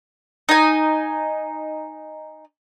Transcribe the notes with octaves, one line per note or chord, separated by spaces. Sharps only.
D#4 G#5